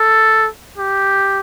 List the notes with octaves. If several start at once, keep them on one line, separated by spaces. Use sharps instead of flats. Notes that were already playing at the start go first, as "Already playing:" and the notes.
Already playing: A4
G4